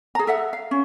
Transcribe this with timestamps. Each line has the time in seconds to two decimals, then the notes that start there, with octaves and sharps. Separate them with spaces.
0.15 G#4 A#5
0.27 A4 E5 F#5
0.53 F5
0.71 C#4